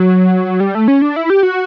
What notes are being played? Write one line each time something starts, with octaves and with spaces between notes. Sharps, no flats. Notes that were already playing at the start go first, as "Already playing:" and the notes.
Already playing: F#3
G3
A3
C#4
D4
E4
G4
F#4